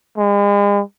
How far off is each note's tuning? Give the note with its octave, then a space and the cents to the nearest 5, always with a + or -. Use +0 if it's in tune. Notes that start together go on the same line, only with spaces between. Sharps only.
G#3 -40